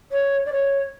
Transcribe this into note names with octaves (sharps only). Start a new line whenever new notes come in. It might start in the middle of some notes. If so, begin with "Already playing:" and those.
C#5
D5
C#5